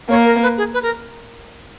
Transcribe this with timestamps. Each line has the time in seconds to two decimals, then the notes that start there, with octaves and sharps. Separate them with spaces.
0.09 A#3 C#5
0.25 A#4
0.42 B4
0.58 G#4
0.74 B4
0.83 A#4